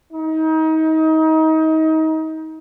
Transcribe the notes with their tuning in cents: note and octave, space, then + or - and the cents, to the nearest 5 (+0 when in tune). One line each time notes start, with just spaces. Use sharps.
D#4 +30